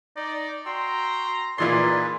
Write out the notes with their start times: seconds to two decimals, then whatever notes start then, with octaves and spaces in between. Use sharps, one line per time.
0.16 D#4 D5
0.66 F#4 G5 A#5 C6 E6
1.58 A#2 E3 D#4 F4 G#4 B4 D5 C6